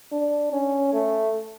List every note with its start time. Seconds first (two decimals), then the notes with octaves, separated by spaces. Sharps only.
0.12 D4
0.53 C#4
0.93 A3